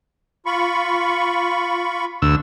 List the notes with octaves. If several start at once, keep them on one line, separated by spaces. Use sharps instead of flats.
F4 B5 C#6
D2 E6